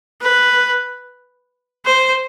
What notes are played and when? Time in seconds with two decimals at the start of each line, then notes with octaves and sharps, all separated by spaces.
0.22 B4
1.86 C5